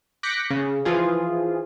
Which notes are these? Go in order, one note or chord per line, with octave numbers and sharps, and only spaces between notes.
D6 F#6 G6 A#6 B6 C#7
C#3
E3 F3 F4 G#4